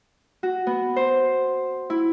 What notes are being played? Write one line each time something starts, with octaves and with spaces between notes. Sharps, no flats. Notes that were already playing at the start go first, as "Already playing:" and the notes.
F#4
B3
C5
E4